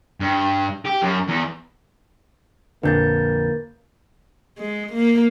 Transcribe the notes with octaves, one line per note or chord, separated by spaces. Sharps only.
G2
G4
F#2
E2
A#1 F2 D3 A#3 D4 B4 G6 A6
G#3
A#3